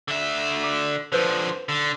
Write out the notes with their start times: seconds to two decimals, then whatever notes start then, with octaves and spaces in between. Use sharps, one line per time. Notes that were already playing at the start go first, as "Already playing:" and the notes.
0.08 D3 E5
0.64 D6
1.12 D3 F3 B4 C5 G6
1.69 D3